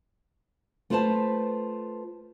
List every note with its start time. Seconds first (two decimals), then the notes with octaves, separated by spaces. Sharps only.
0.90 A3 F4 B4 C5 F5 A5